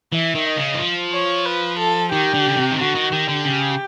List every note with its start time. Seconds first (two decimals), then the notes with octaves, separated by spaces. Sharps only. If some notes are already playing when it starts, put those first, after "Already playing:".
0.12 E3 E5
0.35 D#3
0.46 D#5
0.57 C#3
0.74 E3
0.79 F3
1.12 C#5
1.46 B4
1.79 A4
2.12 D#3 G4
2.34 D3
2.48 C#3
2.57 C3
2.71 D#3
2.79 D3 F#4
2.95 D#3
3.12 D#3 G4
3.28 D3
3.45 C#3